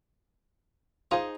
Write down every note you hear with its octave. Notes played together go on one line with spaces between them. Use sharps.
D#4 F4 G#4 C5